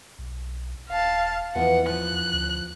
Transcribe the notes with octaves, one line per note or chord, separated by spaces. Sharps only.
B1
D#1 F5 A5
E2 E3 F3 B3 F#5
F3 F#6
D2